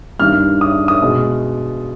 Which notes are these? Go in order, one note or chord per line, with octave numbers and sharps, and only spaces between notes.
G2 D#3 G3 F6
D#6
D#6
B2 G#3